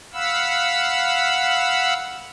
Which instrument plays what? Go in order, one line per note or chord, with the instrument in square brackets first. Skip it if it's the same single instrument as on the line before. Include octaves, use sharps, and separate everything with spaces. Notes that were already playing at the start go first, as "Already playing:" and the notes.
[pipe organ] F5 F#5 B5 E6